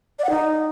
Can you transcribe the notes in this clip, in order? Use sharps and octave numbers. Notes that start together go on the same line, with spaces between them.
D5
F#5
D#4